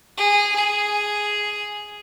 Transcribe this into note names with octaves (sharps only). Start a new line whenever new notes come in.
G#4
G#4